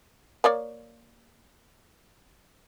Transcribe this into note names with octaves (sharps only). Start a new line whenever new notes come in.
A#3 C#5 D5